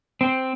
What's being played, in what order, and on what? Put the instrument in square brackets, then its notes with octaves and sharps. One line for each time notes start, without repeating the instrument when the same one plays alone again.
[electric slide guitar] C4